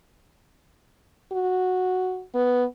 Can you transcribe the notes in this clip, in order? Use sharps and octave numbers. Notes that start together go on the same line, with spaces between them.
F#4
B3